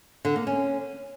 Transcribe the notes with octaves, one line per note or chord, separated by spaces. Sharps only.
D3
A#3
C#4